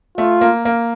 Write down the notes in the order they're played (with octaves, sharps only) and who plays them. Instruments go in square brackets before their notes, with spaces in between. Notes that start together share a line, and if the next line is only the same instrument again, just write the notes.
[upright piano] A3 [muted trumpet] F4
[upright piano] A#3
A#3